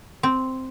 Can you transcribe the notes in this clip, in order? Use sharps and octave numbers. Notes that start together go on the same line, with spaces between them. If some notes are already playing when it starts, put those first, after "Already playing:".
C4